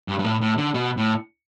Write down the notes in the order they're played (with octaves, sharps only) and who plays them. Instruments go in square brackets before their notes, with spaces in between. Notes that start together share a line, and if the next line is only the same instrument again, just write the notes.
[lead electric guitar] G2
G2
A2
A2
D3
B2
A2